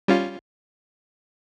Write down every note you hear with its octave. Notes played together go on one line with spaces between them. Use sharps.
G3 C#4 F4